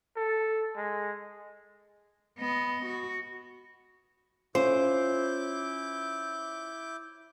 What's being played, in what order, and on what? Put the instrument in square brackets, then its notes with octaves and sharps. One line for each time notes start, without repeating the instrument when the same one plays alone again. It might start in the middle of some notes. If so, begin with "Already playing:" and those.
[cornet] A4
G#3
[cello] B3 D#5
F#4
[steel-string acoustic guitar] C#4 F4 [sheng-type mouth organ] E4 D6 G6 [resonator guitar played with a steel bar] C5